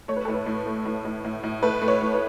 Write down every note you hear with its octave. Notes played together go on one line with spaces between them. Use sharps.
A3 C#5
B4
A2 A4
B4
A2
A3
A2
A2
A2
A2
A3 B4
A3
C#5
A2
B4